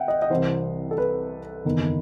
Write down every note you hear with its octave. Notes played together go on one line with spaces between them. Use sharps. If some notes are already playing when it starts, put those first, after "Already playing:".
Already playing: E5 F#5 G5
D#5
D#5
C2 C3 E3 C5
A4
B4
F#1 E2 D#3